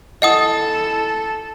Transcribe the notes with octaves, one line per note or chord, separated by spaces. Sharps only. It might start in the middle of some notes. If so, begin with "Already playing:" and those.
E4 A4 D#5 F#5 D#6